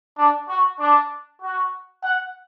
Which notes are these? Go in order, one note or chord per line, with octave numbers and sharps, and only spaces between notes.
D4
F#4
D4
F#4
F#5